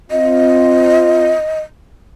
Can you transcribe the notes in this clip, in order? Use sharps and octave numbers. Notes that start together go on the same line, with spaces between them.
C4 F4 D#5